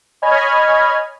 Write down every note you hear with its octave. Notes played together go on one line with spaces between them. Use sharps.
C#5 D#5 G#5 B5 F6 G#6